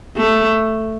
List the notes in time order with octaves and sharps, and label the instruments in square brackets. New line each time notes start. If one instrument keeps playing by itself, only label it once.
[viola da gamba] A3